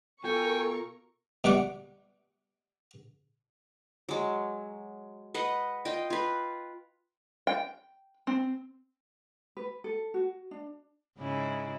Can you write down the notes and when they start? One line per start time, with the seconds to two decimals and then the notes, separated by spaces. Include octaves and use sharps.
0.24 B2 F4 A4 A#4 F5 G5 G#5 C#6
1.44 B2 G3 F#5 D6
4.09 F#3 G#3
5.34 B4 D#5 F#5
5.85 F4 D#5 G5
6.10 F4 B4
7.47 G5
8.27 C4
9.57 B4
9.84 A4
10.14 F#4
10.51 D4
11.19 G#2 C#3 E4